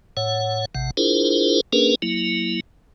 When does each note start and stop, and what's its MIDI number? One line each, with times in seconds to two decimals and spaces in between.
0.17 0.65 45
0.17 0.65 73
0.17 0.65 78
0.75 0.91 33
0.75 0.91 48
0.75 0.91 78
0.97 1.61 62
0.97 1.61 64
0.97 1.61 65
0.97 1.61 68
0.97 1.61 70
0.97 1.61 72
1.73 1.95 58
1.73 1.95 61
1.73 1.95 62
1.73 1.95 68
1.73 1.95 70
1.73 1.95 71
2.02 2.60 54
2.02 2.60 58
2.02 2.60 64